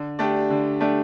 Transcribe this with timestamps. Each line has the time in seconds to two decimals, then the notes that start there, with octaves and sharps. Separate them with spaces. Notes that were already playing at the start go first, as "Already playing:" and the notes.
Already playing: D3
0.19 A3 D4 G4 D5
0.50 D3
0.80 A3 D4 G4 D5